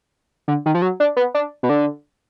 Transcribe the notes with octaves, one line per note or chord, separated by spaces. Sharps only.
D3
D#3
F3
F#3
D4
B3
D4
B2
D3